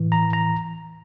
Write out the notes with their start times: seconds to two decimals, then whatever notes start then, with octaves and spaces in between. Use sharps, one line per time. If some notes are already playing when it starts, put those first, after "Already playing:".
Already playing: A2 E3
0.12 A#5
0.33 A#5